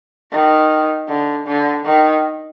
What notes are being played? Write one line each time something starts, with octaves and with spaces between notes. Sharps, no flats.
D#3
D3
D3
D#3